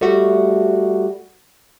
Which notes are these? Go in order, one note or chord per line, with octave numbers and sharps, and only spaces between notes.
G3 A3 F#4